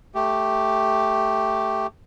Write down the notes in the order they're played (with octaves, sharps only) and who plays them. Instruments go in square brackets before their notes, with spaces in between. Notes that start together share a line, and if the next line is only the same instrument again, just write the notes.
[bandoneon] A3 G4